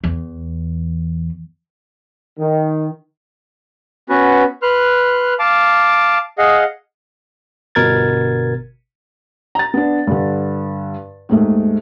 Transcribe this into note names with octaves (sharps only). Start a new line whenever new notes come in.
E2
D#3
B3 C#4 F#4 B4
B4 C6 F6 F#6
F5 A5 D6
G#4 D#5 F5 F#5
G1 B2 A#4 G#6 A6
A#5 A6
B3 D4
G2 D3
D#2 G#2 A3